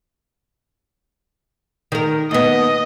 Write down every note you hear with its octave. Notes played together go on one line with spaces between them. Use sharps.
D#3 A#4
D#2 B3 D#5